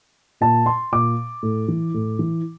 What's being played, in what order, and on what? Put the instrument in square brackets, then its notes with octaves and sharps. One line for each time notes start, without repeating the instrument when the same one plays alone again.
[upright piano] A#2 A5
C6
A#2 D6
A2
E3
A2
E3